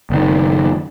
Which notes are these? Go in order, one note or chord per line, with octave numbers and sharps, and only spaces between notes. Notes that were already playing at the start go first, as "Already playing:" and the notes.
F#1 D#3